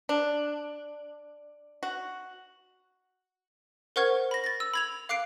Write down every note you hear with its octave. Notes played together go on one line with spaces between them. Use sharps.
D4
F#4
A#4 C5 F#5 C#6 F6 G#6
B5 A#6
A6 A#6
E6
B5 G#6 F7
F5 D6 F#6 C7 D7